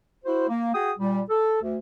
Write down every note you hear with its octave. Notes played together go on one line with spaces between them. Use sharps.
E4 F#4 C5
A#3
F#4 G#4 G5 D#6
A#2 G3
A4
D2